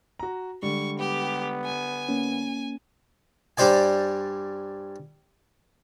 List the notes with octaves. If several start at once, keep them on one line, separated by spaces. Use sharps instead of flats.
F#4 A#5
D3 G3 G#3 C#6
B3 G4
G#5
A#3 C#4
G2 G3 G4 C5 D5 G#5